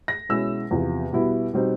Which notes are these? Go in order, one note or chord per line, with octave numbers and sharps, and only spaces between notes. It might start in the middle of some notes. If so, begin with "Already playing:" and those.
A#6
B2 G#3 C#4 E4 E6
E2 C3 F3
B2 G3 B3 E4
B2 G3 C4 D#4